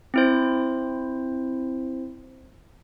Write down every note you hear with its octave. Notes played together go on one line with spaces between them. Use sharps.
C4 E4 C5